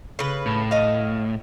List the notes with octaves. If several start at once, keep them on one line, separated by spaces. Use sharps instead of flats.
C#3 B4
A2
D#5 F5